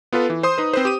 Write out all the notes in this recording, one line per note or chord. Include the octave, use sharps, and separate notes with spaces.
B3 F4 A4 B4
E3
C5 C6 D#6
D#4 B4
C4 B4 C5
G4 D#7